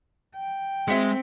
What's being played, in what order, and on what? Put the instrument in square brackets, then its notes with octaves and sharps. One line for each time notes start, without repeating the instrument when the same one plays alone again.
[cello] G5
[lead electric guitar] G#3 [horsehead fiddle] C4 [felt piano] E5 B6 C#7